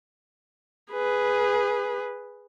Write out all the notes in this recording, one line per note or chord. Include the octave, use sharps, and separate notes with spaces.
G#4 B4